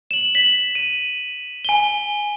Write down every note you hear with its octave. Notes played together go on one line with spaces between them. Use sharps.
E7 F#7
B6 F#7
D#7
G#5 G7